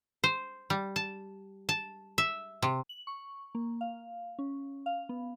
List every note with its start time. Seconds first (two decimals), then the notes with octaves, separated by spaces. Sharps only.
0.24 C5
0.70 G3
0.96 A5
1.69 A5
2.18 E5
2.62 C3
2.89 F#7
3.07 C#6
3.55 A#3
3.81 F5
4.39 C#4
4.86 F5
5.09 B3